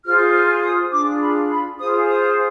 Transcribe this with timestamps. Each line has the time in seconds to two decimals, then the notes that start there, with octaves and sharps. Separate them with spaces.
0.04 F4 G#4 C5 F6
0.34 F6
0.62 D#6
0.91 D4 F4 G#4 D6
1.20 B5
1.49 B5
1.78 F4 G#4 C5 D#6
2.07 D#6